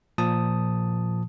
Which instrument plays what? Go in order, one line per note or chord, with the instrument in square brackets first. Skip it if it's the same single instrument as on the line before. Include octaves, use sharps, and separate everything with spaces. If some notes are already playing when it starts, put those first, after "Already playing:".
[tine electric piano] A#2 F3 A5 D#6